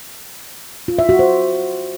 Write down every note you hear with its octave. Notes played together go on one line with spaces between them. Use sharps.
F4
E5
F#4
C5